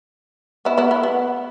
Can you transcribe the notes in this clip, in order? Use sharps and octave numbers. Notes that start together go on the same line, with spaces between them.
B3 E4
B3 E4
B3
B3